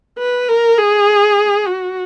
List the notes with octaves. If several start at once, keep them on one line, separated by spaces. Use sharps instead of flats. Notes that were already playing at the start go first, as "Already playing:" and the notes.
B4
A#4
G#4
F#4